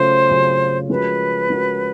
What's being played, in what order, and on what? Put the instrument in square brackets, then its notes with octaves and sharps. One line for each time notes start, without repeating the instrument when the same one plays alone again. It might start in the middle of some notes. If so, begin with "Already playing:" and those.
Already playing: [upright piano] C#3 F#3 A3 C#4 F4 [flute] C5
[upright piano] C#3 F#3 A3 C#4 F4
[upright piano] F3 G#3 C#4 F#4 A#4 [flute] B4
[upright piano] F3 G#3 C#4 F#4 A#4